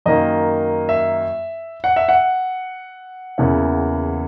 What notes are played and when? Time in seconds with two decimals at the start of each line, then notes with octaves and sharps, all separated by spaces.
0.06 F#2 D#3 A#3 D#5
0.89 E5
1.84 F#5
1.96 E5
2.09 F#5
3.38 E2 C#3 E3 A#3 E4